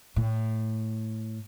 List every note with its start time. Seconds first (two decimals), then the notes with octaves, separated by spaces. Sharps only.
0.16 A2